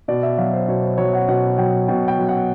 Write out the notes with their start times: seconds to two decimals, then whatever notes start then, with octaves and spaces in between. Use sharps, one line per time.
0.08 B2 D5
0.23 E5
0.38 F#3 F5
0.53 C5
0.68 B2 C#5
0.83 C5
0.98 F#3 C#5
1.13 F#5
1.28 B2 F#5
1.58 F#3 G5
1.88 B2 G5
2.08 G5
2.18 F#3
2.29 F#5